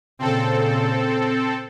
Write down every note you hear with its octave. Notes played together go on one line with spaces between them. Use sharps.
A#2 C#3 C4 A4